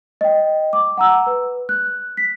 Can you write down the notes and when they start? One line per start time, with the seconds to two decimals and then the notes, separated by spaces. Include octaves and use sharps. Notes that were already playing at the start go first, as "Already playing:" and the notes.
0.21 D#5 G5
0.73 D6
0.98 F#5 A#5 E6
1.27 B4
1.69 F#6
2.17 B6